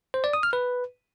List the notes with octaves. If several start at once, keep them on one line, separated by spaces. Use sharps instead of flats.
C5
D5
D#6
F6
B4